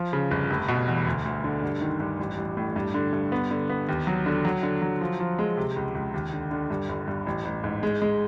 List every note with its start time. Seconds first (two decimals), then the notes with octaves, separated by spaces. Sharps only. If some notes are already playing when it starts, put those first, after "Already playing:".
Already playing: F3
0.13 C#3
0.31 G1
0.50 F1
0.68 B2
0.88 E2
1.07 D2
1.25 D2
1.44 D3
1.62 G2
1.81 D#3
2.00 G2
2.18 A1
2.38 A1
2.57 A2
2.76 G2
2.94 D3
3.13 G2
3.32 B3
3.51 D3
3.69 B3
3.89 D#2
4.07 F#3
4.26 D3
4.45 F#3
4.63 D3
4.82 F#3
5.01 F3
5.20 F3
5.39 G#3
5.57 C3
5.76 C#2
5.95 C#2
6.14 D#2
6.33 D3
6.51 D3
6.71 G2
6.89 G1
7.08 G2
7.26 A1
7.45 A1
7.64 G#2
7.83 G#3
8.02 G#3